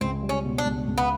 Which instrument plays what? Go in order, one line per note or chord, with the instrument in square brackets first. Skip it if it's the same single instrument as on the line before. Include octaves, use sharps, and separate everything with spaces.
[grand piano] C#2 [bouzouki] C4
[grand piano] G3
[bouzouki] C#4
[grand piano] B2
[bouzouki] D4
[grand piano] C#2
C#2
[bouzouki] B3